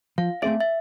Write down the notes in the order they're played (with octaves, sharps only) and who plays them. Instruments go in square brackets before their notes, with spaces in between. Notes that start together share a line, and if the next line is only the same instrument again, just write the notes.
[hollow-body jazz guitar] F3 [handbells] F5
[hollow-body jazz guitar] A3 C4 G#4 D5 [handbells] E5
[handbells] E5